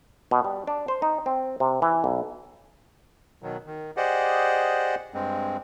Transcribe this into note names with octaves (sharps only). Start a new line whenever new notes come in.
B2
G3
D4
C5
D#4
C4
C3
E3
B1
B2 D#3 F#3
D#3
G4 G#4 C5 D5 D#5 F#5
G2 G#3 C4